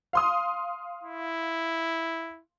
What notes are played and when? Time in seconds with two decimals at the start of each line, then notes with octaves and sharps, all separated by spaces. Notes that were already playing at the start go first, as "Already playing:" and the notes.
0.13 F5 C6 D#6
1.03 E4